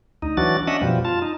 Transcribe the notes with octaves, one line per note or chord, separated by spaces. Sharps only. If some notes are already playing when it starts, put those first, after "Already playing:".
D2 D#4
E3 F#3 D4 F#4 A6
C#4 D4 D#5 E5 F#5
F#2 B2 F3 G3
F4 A5
D#4